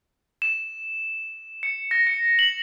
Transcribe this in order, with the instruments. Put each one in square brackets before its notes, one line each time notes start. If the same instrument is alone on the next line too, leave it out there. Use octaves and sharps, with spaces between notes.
[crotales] E7
C#7
A#6
C#7
F#7